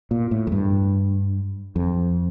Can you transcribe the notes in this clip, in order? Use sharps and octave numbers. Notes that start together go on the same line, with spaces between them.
A#2
A2
F2
G2
F2